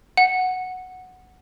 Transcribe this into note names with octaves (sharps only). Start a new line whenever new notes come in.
F#5